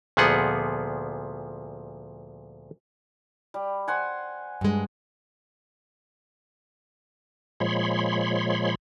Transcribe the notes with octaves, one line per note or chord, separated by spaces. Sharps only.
D2 A#2 F3 B3 G#4 F#5
G3
C5 F#5 G#5
G2 G#3
A#2 F3 G#3 C#5 B5 C6